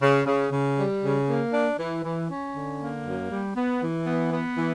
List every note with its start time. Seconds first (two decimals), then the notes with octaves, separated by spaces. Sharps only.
0.01 C#3
0.26 C#3
0.51 C#3
0.77 G3
1.03 C#3
1.28 A#3
1.53 D4
1.79 E3
2.04 E3
2.29 C#4
2.54 D3
2.80 A#3
3.05 F#2
3.31 G3
3.55 B3
3.81 E3
4.06 B3
4.31 B3
4.57 E3